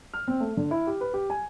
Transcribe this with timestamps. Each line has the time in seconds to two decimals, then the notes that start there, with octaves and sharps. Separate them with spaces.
0.14 F6
0.28 C4
0.40 A3
0.57 D3
0.71 E4
0.87 G4
1.01 B4
1.14 G4
1.30 G#5